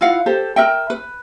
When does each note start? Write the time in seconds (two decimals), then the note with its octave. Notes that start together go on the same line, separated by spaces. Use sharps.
0.01 E4 F4 F5 F#5
0.26 G4 A4 C5
0.56 A#4 E5 G5
0.90 B4